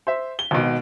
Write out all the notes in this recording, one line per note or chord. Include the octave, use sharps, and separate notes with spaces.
C5 E5
G7
G#1 B2